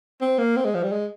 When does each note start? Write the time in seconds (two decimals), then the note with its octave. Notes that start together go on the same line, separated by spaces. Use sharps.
0.21 C4
0.39 A#3
0.56 C4
0.65 G#3
0.75 F3
0.84 G3
0.92 G#3